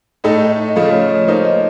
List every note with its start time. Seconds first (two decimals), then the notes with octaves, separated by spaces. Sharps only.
0.24 A2 A3 D#4 A4 D#5
0.69 D#5
0.76 C#3 F3 A3 F5
0.87 C#5
0.93 D#5
1.10 C#5
1.28 F3 A#3 D#4 C5
1.45 D#5